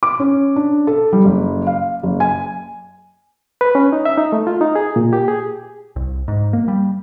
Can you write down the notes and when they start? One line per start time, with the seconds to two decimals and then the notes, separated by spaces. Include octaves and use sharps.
0.03 D6
0.19 C#4
0.56 D4
0.87 A4
1.13 G3
1.25 F#1
1.67 F5
2.03 F#1
2.20 G#5
3.61 B4
3.75 C#4
3.92 D#4
4.05 E5
4.18 D#4
4.32 A3
4.47 F4
4.61 D#4
4.76 G#4
4.96 A#2
5.13 G4
5.28 G#4
5.96 C2
6.28 G#2
6.53 A#3
6.68 G3